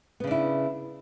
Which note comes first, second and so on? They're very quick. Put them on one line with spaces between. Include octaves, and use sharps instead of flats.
B3 C#3 D4 E4